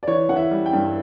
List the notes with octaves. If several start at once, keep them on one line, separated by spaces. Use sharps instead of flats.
D5
E3 C#5
E3 F#5
E5
G3
G5
G2